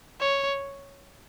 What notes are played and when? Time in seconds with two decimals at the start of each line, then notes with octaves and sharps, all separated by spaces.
0.21 C#5